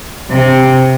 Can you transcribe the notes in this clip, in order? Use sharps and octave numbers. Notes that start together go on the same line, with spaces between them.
C3